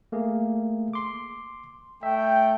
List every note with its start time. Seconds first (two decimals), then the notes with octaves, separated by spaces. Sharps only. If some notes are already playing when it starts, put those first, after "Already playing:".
0.12 A3 A#3 G#4
0.93 C6 D6
2.03 A3 E5 G5